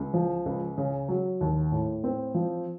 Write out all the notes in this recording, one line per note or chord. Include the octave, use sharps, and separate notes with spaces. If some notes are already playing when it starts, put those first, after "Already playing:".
Already playing: C#2
F3
C#2
C#3
F#3
D#2
A2
C4
F3